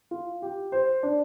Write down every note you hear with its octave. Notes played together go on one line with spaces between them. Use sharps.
F4
G4
C5
D4